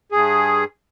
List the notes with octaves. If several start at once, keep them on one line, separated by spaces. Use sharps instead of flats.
G2 G#4